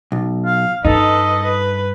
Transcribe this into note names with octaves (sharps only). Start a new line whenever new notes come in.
B1
F5
G2 C#4 D#4 A4 B4 D#5
B4